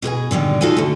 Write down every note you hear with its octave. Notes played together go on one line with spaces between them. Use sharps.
B2 G#4 A#4 G#5
A#2 D3 D#3 G3
D#4 F4 F#4 A4 C5 G#5
D3 A3